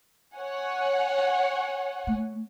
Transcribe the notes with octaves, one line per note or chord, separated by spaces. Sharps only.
C#5 F#5 G#5
A3